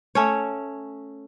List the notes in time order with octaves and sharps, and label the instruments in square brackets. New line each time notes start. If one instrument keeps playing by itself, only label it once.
[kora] A3 C#4 C#5